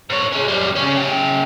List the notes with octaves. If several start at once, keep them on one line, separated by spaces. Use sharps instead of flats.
G#2 C#5
G#3 C#4
F#2 G3
C#3 C#4
C#3 G5